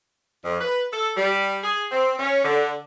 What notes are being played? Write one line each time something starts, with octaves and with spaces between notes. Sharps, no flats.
F2
B4
A4
G3
G#4
C4
C#4
D3